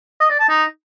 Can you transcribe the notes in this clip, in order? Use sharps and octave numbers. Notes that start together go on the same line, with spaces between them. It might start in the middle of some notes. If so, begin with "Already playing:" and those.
D#5
D5
A5
D#4